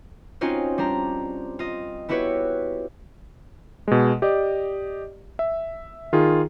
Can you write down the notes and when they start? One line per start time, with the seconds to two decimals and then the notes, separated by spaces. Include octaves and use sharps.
0.41 C4 C#4 D#4 F4 F#4 C5
0.78 G3 D4 C5 A#5
1.59 F4 D#5
2.09 B3 E4 F#4 G4 B4 C#5
3.88 B2 G#3
4.22 G4 D5 D#5
5.39 E5
6.13 D#3 F4 G#4